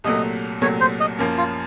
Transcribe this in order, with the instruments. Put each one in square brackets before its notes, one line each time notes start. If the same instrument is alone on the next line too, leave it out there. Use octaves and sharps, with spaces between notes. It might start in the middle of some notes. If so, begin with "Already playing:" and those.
[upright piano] C2 A#2 F#3 A3 [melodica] D#5
[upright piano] C2 A#2 F#3 A3 [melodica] C#5
[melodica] C5
D#5
[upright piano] F#2 F3 A#3 C#4
[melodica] F4